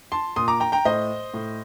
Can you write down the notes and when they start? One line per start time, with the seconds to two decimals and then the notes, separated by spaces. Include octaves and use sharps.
0.12 A5 C6
0.36 A#2 C6 D#6
0.48 A#5 D6
0.60 G5 A#5
0.72 G5 A#5
0.85 A2 C5 D#5
1.34 A2